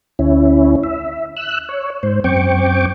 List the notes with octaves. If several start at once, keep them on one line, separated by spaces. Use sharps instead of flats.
D2 C#4 E4
E5
E6 F#6
C#5
G#2 C5
F#2 C4 G5 C#6 D6